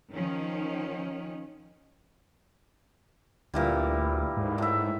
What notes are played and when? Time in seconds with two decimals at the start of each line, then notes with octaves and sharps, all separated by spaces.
0.14 D#3 F3 C#4
3.54 D2 A#2 E3 G3
4.37 G#2
4.58 A2 E5